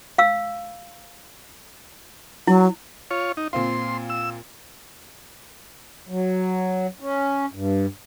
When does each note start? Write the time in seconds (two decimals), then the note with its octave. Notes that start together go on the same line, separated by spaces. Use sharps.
0.18 F5 E6
2.47 F#3 E4
3.11 F4 C#5
3.37 D#4
3.53 A#2 C4 F4 C6
4.10 E6
6.09 F#3
7.00 C#4
7.53 G2